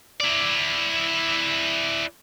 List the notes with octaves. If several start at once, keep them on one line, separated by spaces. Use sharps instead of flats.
E4 D5